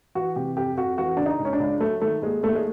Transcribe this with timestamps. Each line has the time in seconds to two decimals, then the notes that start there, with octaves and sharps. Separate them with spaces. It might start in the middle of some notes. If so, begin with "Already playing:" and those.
0.15 E3 F#4
0.36 C3 G4
0.57 F2 G4
0.77 F2 F#4
0.98 E3 F#4
1.17 C#3 D4
1.26 D#4
1.39 C#2
1.45 C#4
1.53 D4
1.60 C#2
1.81 F#3 A3
2.02 D#3 A3
2.22 D#2 G#3
2.43 D#2 A3
2.55 G#3